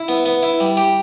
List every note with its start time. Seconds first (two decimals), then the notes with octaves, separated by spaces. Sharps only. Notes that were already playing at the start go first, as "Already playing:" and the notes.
Already playing: E4
0.08 B3
0.26 B3
0.43 E4
0.60 G3
0.77 G4